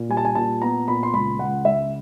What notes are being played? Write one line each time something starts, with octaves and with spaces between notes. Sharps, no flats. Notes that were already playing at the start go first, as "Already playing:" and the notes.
Already playing: A#2
G3 G#5
A5
G#5
A#2 A5
B3 A#5
A#2 B5
C6
C#2 B5
C#2 F#5
C#2 E5